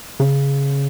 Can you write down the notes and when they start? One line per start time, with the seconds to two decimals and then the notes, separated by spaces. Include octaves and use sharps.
0.20 C#3